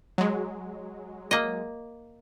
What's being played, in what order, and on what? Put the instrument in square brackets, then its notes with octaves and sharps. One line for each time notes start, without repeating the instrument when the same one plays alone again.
[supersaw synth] F#3 G#3
[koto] A#3 D#5